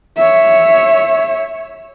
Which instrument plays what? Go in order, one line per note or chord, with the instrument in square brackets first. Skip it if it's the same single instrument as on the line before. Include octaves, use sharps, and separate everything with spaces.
[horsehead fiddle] C#5 E5